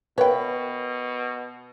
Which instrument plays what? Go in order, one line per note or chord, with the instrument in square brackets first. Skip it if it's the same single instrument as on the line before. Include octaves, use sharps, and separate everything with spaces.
[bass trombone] B2 [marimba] A#4 B5 [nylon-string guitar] B4 [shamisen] C#5 G5